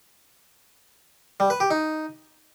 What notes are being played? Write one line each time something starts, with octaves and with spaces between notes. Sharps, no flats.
G3
B4
G4
D#4